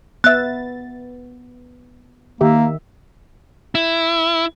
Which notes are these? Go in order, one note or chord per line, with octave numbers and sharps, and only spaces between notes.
B3 E5 F#6 A6
D#3 A#3 G4 E5
E4